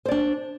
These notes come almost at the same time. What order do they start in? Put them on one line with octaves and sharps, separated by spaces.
C5 D5 D4